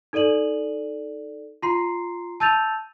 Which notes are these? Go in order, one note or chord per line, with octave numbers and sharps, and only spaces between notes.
D#4 A4 D5 D#7 F#7
F4 A#5 C6 C7
A5 E6 G6 A6 D#7 F7